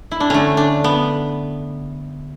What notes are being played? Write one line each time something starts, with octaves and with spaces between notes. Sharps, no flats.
E4
D4
D3 A3 C#4
D4
B3